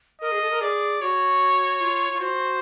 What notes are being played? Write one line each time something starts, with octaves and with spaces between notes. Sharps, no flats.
A#4 D#5
G#4
A4
A#4
G#4 D5
F#4 C#5
F4
F4
F#4 C5